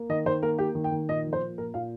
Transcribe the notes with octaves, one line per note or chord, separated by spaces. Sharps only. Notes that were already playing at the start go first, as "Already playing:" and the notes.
Already playing: A#3
D#3 D#5
D#3 C5
A#3 A#4
A#3 G4
D#3
G5
D#3
A#2 D#5
F3
C5
A#3
A#2 A#4
A#2 F5